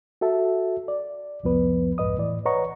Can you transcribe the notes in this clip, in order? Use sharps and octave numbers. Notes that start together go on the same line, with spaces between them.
F#4 A4 E5 A5
D5
C2 F2 F3 B3 B4
C2 F2 G#2 B4 D#5 D#6
A2 E3 D5
B4 C#5 D#5 F#5 A#5 C#6